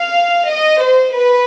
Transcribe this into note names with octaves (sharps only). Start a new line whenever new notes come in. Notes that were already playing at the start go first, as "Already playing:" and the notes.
Already playing: F5
D#5
C5
B4